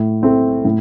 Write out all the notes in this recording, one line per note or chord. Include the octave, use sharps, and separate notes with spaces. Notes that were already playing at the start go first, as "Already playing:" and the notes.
Already playing: A2
A3 C4 E4
A2